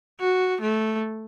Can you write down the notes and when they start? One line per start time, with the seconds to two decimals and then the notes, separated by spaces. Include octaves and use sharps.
0.20 F#4
0.61 A3